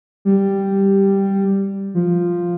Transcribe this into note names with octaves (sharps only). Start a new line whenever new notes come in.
G3
F3